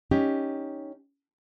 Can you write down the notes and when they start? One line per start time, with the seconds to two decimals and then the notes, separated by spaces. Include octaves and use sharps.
0.11 C#4 D#4 G4